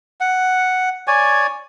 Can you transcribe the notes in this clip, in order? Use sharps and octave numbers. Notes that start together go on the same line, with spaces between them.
F#5
C#5 D5 G#5